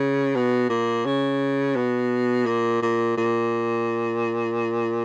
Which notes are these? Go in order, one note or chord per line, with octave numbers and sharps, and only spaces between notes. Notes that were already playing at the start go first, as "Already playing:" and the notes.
Already playing: C#3
B2
A#2
C#3
B2
A#2
A#2
A#2